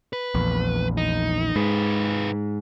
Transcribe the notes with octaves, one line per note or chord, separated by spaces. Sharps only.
B4
A#1 E2
D#4
G#2 G#3 B4